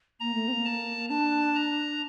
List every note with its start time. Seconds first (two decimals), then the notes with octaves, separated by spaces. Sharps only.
0.20 A#3 A#5
0.34 A3
0.48 C4
0.53 A#3
0.65 A5
1.10 D4 A5
1.55 A#5